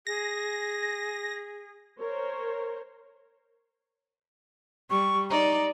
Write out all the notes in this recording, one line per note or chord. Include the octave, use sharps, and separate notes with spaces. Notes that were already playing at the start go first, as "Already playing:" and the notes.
G#4 A#6
A#4 C5 C#5
G3 C#6
D#4 D5 A#5